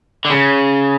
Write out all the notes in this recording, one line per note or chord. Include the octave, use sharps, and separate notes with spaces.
D3
C#3